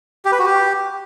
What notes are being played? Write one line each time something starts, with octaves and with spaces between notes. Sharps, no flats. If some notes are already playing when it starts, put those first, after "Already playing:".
G4
B4
F#4
G4